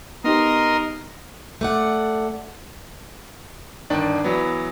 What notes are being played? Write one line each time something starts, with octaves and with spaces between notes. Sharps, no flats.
B3 D#4 G4 A#4 D#5 C6
A3 D5 F#5
G1 D#3 D4 D5
E3 F#3 B3